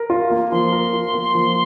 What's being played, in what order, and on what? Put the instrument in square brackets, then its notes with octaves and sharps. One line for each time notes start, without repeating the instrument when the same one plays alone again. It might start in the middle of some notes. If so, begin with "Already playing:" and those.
Already playing: [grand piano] A#4
F4
A#3
[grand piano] F3 [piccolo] C6
[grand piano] A#4
F4
A#3
F3